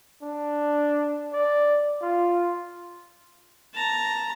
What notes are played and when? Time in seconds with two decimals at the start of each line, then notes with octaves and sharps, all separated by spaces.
0.22 D4
1.33 D5
2.02 F4
3.74 A5 A#5